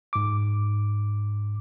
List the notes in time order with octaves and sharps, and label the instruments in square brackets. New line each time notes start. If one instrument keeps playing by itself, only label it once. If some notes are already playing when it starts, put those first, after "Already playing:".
[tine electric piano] G#2 D6